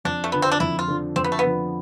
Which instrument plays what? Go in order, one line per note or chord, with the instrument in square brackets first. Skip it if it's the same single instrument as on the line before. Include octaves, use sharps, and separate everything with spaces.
[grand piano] F2 [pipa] D4
[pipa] A3
[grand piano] D3 F3 [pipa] B3
[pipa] C4
D4
[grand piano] F2 [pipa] E4
[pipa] F4
[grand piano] D3 F3
[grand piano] F2 [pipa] C4
[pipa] B3
A3
B3
[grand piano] D3 F3